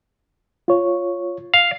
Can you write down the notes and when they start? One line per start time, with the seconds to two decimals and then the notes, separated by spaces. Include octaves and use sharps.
0.68 F4 C#5
1.54 F5